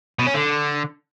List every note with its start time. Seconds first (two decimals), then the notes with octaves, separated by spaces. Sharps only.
0.19 B2
0.27 C#4
0.34 D3